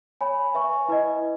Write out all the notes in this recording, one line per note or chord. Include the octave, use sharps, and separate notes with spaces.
C#5 G#5 B5
B4 E5 G#5 C#6
E4 B4 D#5